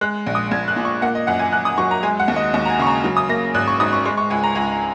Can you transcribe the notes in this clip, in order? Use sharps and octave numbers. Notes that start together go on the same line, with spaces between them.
G#3 F#6
A#1
D#6
A#1 G#6
F#6
A#2
C#6
A#3 F#5
D#5
F#2 F#5
G#5
F#2 F#6
D#6
F#3 C#6
A#5
G#3 G#5
F#5
D#2
D#5
D#2
A#5
G#5
C#3 C#6
A#5
F#3
D#6
A#3 A#6
G#1 F#6
C#6
G#2 D#6
C#6
G#3 C#6
C#6
C#2 G#5
A#5
C#2 G#5